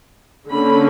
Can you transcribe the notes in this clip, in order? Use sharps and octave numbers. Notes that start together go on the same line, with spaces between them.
D3 A#3 C#4 B5